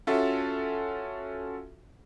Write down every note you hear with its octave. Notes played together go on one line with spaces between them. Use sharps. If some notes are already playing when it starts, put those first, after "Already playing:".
C#4 F4 F#4 A4 E5